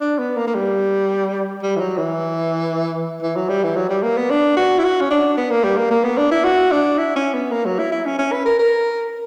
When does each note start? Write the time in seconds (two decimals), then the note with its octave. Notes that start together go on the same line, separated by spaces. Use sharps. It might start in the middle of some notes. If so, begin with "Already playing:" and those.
0.01 D4
0.19 B3
0.36 A#3
0.47 A#3
0.54 G3
1.62 G3
1.76 E3
1.80 F#3
1.98 E3
3.22 E3
3.36 F#3
3.49 G3
3.63 E3
3.76 F#3
3.89 G3
4.03 A#3
4.17 B3
4.30 D4
4.57 F#4
4.79 E4
4.84 F#4
5.01 C#4
5.10 D4
5.37 B3
5.50 A#3
5.64 G3
5.77 A#3
5.91 A#3
6.04 B3
6.17 D4
6.31 E4
6.44 F#4
6.71 D4
6.98 E4
7.16 C#4
7.33 B3
7.52 A#3
7.65 F#3
7.79 E4
7.92 E4
8.05 C#4
8.19 C#4
8.32 B4
8.46 A#4
8.59 A#4